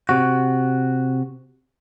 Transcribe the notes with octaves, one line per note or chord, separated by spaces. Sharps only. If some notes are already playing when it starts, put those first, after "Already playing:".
C3 F#4